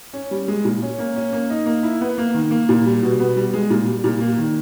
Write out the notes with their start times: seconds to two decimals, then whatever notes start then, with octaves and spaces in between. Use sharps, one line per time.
0.13 C#4
0.31 G3
0.48 G#3
0.65 A#2
0.82 C#4
0.99 A#3
1.16 C#4
1.33 A#3
1.50 D#4
1.66 A#3
1.83 E4
2.01 B3
2.18 A#3
2.34 D#3
2.51 A#3
2.69 A#2
2.86 G3
3.03 B2
3.20 B3
3.36 G3
3.54 G#3
3.70 A#2
3.87 G3
4.04 A#2
4.21 A#3
4.38 D#3